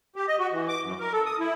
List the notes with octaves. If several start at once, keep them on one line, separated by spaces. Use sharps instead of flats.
G4
D#5
F#4
E3
D6
F#2
A#4
A4
D#6
E4